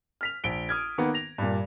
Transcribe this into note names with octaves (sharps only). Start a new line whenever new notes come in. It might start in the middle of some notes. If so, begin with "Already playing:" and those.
F6 B6 F7
A#1 D7 G7
D#6 F6 G#6
D#3 A#3 B3
A#6 F7
G2 A#2